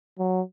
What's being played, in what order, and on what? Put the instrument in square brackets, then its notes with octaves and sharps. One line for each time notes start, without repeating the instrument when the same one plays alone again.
[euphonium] F#3